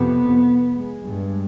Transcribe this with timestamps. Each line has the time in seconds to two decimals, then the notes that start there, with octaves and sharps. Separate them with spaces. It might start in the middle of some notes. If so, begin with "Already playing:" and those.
Already playing: F2 C3 B3
0.74 G#3
1.04 G2